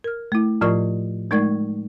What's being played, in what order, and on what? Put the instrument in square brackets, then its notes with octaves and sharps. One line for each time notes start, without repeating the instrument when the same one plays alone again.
[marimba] A#4 F6
A3 E4
A2 F3 F4 A#4 D5 C#6
G#3 A3 D#4 A#4 D5 G#6